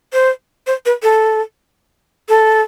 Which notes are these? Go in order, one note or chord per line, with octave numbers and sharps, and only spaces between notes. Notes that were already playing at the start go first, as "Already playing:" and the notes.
C5
C5
B4
A4
A4